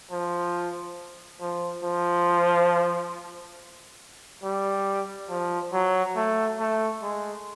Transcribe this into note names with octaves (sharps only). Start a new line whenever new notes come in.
F3
F3
F3
G3
F3
F#3
A3
A3
G#3